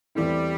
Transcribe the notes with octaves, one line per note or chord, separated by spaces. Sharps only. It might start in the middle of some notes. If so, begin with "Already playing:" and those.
E2 E3 G3 A3 C4 E4